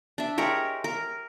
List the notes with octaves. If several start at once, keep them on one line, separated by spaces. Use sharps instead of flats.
D4 E5
G#3 G4 A#4 C#5
A#4